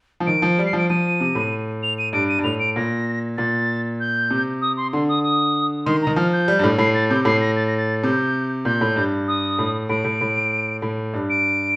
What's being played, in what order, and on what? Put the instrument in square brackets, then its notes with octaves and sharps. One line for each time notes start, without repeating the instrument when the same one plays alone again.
[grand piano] F3
[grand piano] D#3 [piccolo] D7
[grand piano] F3
G3
[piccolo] C7
[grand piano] F3 [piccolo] D7
[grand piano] F3 [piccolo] D#7
[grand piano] C3
A2
[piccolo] F7
D#7
[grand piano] G2 [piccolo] D7
[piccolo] D#7
[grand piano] G2
[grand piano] A2 [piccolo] F7
[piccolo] D7
[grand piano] A#2 [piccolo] A#6
[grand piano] A#2 [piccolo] A6
[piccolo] G6
[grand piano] C3
[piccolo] D#6
C6
[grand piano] D3 [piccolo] C6
[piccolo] D#6
D#6
[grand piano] D#3 [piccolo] C6
[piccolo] A#5
[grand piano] D#3
[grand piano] F3 [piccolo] F6
[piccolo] G6
[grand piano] G3
G2
A2
[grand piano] A2 [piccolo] C7
[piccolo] A6
[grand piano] C3 [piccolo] G6
[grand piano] A2 [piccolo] C7
[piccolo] A#6
A6
A#6
A6
[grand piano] C3 [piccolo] G6
[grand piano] A#2 [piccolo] G6
[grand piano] A2
G2
[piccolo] D#6
[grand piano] A2
[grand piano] A2 [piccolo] D7
[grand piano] A2
A2
A2
G2
[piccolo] D7